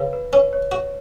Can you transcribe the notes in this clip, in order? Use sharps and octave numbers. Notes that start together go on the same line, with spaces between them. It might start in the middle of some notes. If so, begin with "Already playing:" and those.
Already playing: C#3 B4
B4
C#4 B4
C#5
F#4 C#5